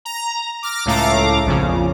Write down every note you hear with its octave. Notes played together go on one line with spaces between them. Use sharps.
A#5
D6 F6 A#6
C#2 A2 A3 F5 A#5 D6
A#1 F2 C#3